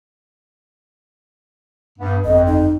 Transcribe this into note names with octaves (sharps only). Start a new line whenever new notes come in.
G2 B3
G1 F2 D#5
D#4